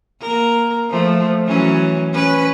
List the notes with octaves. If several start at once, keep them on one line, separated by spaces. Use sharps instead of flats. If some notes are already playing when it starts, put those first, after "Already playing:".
A#3 A#4
F3 A3
E3 F#3 C#4
C#4 B4